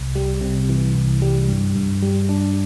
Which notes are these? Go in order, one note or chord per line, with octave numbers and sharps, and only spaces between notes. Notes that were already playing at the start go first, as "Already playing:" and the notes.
Already playing: C2
G3
C3
E3
C2
G3
G2
G2
G3
D4